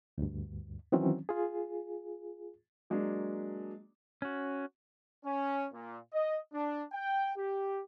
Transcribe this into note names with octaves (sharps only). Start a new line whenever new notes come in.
D2 G2
D#3 E3 F#3 C4 C#4
F4 G#4
F#3 G#3 A#3 D4
C#4 F#4
C#4
A#2
D#5
D4
G5
G4